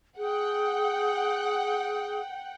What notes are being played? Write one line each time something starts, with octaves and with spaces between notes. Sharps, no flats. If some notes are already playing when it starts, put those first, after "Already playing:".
G#4 F#5 G5